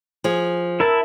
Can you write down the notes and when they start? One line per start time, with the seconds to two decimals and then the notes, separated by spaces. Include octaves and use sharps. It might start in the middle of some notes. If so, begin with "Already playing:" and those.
0.24 F3 G#4
0.80 E4 A#4 E5 A5